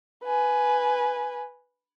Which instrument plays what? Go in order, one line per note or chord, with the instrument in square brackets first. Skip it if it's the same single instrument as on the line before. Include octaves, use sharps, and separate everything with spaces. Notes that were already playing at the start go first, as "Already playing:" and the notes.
[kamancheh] B4 G#5